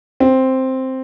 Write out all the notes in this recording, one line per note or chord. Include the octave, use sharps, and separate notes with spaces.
C4